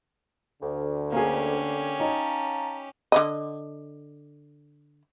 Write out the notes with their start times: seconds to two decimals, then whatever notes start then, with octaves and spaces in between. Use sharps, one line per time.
0.61 D2 D3
1.12 A#3 C#4 G4 G#4
2.00 D#4 C#5 D#5 F5 A5 A#5
3.12 D3 D#3 D#5